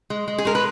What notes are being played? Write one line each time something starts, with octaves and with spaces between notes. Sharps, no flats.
G#3
G#3
G#4
G#3 A#4
B4